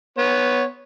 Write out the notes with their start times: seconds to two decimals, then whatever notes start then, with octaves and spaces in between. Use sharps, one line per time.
0.18 B3 C#5